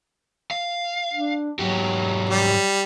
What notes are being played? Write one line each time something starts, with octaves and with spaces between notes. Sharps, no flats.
F5
D4
G#2 F#3 F#4 G4
G3